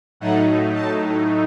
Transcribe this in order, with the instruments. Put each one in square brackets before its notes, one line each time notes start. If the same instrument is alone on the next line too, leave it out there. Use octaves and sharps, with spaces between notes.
[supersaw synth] A2 F#3 A3 D#4 F#5
A5